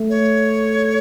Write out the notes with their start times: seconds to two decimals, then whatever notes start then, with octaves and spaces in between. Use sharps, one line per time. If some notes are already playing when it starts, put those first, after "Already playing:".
Already playing: A3
0.10 C#5